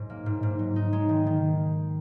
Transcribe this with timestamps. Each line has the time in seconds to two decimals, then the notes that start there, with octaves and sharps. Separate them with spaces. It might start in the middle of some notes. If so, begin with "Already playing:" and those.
Already playing: G#2 F#3
0.10 A#3
0.26 G#2
0.43 G#2
0.59 F#3
0.76 D#4
0.93 G#3
1.09 D#3
1.26 D#3